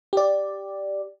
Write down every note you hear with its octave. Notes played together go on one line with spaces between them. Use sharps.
G4 D5